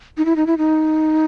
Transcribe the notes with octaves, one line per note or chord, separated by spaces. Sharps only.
D#4
E4
D#4
E4
D#4